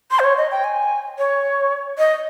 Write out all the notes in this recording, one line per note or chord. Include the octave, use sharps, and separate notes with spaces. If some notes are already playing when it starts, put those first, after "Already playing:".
C6
C5
C#5
D#5
G5
G#5
C#5
D#5